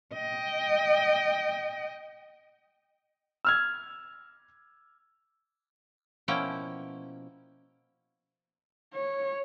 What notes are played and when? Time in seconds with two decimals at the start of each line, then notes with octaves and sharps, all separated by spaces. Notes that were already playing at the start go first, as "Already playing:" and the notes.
0.15 D#5 G5
3.45 E6 F6 G#6
6.28 B2 F3 A#3 C#4 E4 G5
8.94 C#5